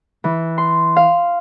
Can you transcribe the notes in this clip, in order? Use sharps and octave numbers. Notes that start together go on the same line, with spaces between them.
E3
C6
F5